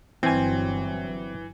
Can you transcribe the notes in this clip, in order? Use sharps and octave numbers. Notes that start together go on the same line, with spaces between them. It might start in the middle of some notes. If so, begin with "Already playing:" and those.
G1 G2 E3 F#3 C4 G#5